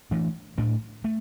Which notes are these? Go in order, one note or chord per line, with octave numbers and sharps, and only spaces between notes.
E3 A3 D4
A2 A3 D4
A3